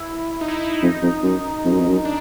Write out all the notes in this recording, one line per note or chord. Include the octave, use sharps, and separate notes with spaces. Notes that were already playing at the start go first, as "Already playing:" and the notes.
Already playing: E4
D#4
E4
D#4
F2
F2
F#2
F2
F#2
F2
F#2
D4